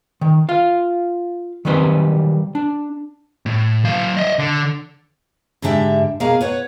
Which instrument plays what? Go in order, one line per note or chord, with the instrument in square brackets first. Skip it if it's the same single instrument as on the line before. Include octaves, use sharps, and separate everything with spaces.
[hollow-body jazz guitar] D#3
F4 F5
D#3 F#3 G3 C4 B4 D#5
D4
[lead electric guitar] A2
F#3 F5
D#5 E5
D3
[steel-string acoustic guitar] G#2 D3 G3 D4 E5 G5
B2 A#3 G#4 F5 A#5
B4 C#5 F#5